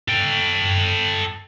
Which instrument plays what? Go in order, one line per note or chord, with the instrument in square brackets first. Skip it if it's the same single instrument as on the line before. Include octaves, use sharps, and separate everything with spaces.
[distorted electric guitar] A4 G5